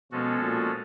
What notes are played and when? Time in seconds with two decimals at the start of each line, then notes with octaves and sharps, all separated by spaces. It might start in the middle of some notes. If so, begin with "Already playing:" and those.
0.12 B2 F3 G#3 C#4 F#4 A4
0.41 A#2